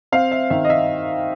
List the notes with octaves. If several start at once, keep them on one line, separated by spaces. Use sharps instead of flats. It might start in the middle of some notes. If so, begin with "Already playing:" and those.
C4 F5
E5
D#3 E5
D#5
E5